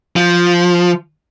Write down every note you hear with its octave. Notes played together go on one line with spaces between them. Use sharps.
F3